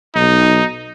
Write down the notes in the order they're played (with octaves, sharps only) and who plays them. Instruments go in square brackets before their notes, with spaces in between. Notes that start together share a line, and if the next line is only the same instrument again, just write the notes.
[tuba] B1 [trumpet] D#4